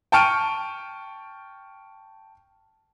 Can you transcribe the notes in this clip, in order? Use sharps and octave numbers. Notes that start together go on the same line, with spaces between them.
G5 A5 C#6 F6 D7 D#7